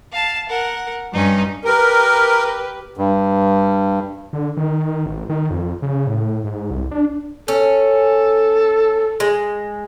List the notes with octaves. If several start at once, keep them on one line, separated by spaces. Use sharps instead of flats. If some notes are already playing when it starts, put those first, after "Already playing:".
F5 A5
A#4 F#5
G2 C#4 D#4
G4 A#4 B4
G2
D3
D#3
A1
D#3
F2
C#3
A2
G#2
C2
D4
C#4 A4
G#3